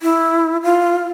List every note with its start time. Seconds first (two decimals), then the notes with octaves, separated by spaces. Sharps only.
0.02 E4
0.63 F4